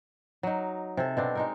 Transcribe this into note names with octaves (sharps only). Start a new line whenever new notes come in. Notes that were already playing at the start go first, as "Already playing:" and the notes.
F#3 D#4
C3 G#4 A4
B2 C4 D4
G#3 D#4 A#4